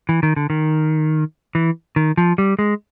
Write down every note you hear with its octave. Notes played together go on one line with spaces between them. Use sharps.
E3
D#3
D3
D#3
E3
D#3
F3
G3
G#3